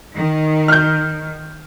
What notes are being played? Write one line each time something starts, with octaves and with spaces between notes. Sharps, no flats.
D#3
F6 G6